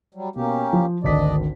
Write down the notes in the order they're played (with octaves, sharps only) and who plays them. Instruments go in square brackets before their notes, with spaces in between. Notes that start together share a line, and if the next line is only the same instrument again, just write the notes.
[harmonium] F#3 G3
[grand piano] B2 [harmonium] A#3 C#4 G4
[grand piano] F3
[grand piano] G#1 D2 B6 [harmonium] D4 D5 D#5